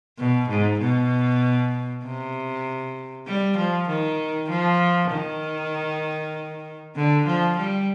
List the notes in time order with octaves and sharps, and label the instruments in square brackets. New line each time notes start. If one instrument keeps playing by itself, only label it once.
[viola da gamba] B2
G#2
B2
C3
G3
F3
D#3
F3
D#3
D3
F3
G3